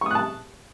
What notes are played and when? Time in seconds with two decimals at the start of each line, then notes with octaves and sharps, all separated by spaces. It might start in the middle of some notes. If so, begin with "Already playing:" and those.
0.01 C#6
0.06 D#6
0.11 F#6
0.15 A5